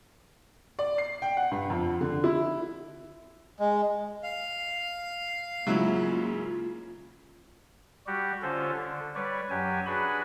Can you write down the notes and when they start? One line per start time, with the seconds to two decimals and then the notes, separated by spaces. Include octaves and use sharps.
0.79 D5
0.98 C7
1.22 G5
1.37 F#5
1.51 G2
1.70 F2
2.01 D3
2.24 E4
3.59 G#3
4.23 F5
5.67 G#2 C#3 F#3 A#3 E4 F4
8.07 G3 F#4 G4
8.42 D3 C#4 F4 A4 C5
8.77 D3
9.15 G3 B4 C#5 D5
9.50 F#2 F#3 G4 G#5
9.86 D4 F#4 G#4 B4 G#5 B5